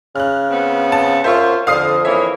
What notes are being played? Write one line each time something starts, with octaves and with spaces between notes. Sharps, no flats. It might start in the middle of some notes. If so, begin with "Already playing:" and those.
C#3 F6 F#6
B3 C4
A5
F#2 F4 C5 E5 C#6
F2 D3 F5 D#6 C7
E3 A#3 C#5 E5